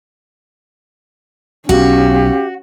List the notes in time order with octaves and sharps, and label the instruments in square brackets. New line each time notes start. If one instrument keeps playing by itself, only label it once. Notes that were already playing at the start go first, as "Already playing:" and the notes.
[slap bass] B1 [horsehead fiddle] C#4 [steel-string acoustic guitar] F#4 [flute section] G4 F5